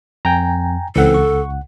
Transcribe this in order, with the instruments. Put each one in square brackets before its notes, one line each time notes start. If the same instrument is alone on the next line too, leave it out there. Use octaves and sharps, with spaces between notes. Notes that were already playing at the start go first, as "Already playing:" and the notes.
[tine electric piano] F2 [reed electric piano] G5 G#5 A#5
[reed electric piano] C#2 F#5 [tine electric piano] E3 C4 [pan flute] A4
[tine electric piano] C#6